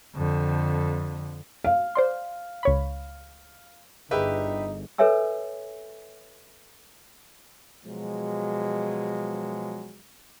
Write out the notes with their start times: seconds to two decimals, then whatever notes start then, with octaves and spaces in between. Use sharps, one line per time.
0.15 F2 D3
1.64 F5
1.95 C5 D5 C6
2.63 C#2 C#5 B5
4.11 G1 D#4 G4 G#4 B4 E5
4.98 A4 B4 C#5 E5 G#5 E6
7.86 B2 F3 F#3 G#3